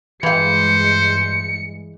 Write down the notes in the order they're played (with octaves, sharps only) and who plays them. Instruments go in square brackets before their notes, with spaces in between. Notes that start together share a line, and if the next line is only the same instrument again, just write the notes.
[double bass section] G2 G#3 [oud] E3 F5 [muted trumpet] C5 [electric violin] C#7